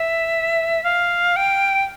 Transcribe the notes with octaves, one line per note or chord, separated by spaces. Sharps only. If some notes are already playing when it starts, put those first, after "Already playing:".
Already playing: E5
F5
G5